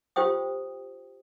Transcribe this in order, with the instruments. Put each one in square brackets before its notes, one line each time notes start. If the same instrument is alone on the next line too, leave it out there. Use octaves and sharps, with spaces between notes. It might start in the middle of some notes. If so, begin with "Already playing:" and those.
[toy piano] F4 G4 C5 G5 D#6